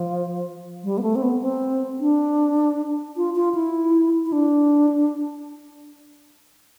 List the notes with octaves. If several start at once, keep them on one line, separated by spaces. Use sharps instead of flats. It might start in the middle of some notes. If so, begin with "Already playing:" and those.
Already playing: F3
G3
B3
A3
C4
B3
C4
D4
F4
F4
E4
E4
D4